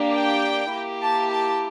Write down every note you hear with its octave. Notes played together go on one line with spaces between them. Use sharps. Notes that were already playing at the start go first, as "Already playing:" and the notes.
Already playing: A#3 D4 G4
G5
A#3 E4 G4
A5
A5